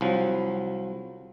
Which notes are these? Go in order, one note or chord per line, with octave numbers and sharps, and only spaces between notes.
C2 F3 F#3